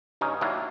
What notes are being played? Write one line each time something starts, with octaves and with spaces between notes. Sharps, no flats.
G2 C#4 D#4
D#3 F#3 A#3 D4 E4